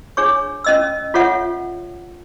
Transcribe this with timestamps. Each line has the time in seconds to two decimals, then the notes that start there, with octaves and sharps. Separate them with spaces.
0.17 D4 G#4 C#5 C#6
0.64 C#4 D#5 E6
1.14 F4 A4 C#5 E5 F#5